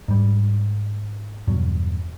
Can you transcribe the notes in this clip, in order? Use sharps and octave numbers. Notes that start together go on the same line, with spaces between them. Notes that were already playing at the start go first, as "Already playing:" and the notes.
G#2 G3
E2 G2 B2 F#3